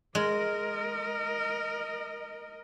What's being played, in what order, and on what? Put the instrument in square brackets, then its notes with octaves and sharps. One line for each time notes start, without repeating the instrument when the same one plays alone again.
[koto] G#3 [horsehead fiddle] A#4 D#5